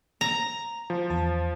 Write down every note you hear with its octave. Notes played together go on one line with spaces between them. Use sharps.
A#5
F3
E2 A5